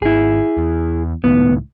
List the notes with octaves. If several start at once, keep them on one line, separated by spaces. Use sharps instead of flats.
G#1 E4 G#4
E2
C#2 A2 D#3 B3